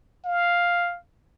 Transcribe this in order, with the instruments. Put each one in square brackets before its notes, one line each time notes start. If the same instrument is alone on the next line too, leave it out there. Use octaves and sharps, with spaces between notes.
[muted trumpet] F5